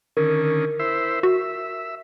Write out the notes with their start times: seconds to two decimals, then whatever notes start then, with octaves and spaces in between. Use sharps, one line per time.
0.17 D3 D#3 C#4 A#4
0.79 E4 C5 E5
1.23 F#4 E5